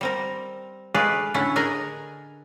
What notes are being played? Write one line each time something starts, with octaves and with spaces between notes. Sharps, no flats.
G3 C4 A#4
G#3 A3 G#4 B4 D5 F5
A2 D3 C#4 E4 A4
D3 G#4 A#4 D#5 G#5 A#5